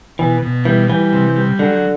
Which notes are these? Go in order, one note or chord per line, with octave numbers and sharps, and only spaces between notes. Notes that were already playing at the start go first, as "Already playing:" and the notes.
B2 E3
B2
E3 G3
E3 G3
C3
G3
D3 F#3